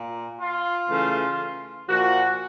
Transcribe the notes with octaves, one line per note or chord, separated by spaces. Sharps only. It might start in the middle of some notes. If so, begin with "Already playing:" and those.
Already playing: A#2
F4
C#3 E3 A3
A#2 F3 A#3 F#4